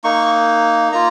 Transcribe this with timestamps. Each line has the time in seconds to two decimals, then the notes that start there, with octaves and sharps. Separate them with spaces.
0.04 A#3 D#4 C#6
0.92 A#3 F4 A#5